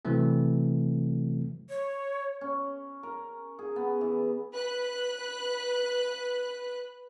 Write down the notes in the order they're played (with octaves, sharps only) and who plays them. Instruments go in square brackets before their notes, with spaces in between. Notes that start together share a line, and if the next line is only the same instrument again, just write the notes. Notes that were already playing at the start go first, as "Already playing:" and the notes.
[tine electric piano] C3 E3 F#3 A3 C4
[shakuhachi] C#5
[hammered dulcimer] C#4
A#4
G#4
B3
E3
[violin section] B4 F#6